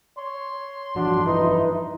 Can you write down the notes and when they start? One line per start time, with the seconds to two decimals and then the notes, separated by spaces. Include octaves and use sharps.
0.18 C#5 C6
0.96 G2 E3 F3 D4 F#4
1.26 D#4 E4 B4